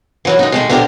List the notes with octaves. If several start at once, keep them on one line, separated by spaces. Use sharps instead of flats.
E3 F#3 A#4
F#2 D#4
D#3 G#3 A3
D3 F3 A#3 C#4 G4 A#4